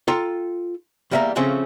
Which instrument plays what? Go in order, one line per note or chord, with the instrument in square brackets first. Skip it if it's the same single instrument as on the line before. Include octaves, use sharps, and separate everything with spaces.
[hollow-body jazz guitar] F4 A4 G5 A#5
E2 G3 A#3 D#5 E5 A#5
C#3 F3 A3 C4 C#4